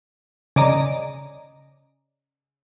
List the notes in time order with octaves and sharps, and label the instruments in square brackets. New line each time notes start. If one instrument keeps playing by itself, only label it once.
[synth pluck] C#3 D5 D#5 A#5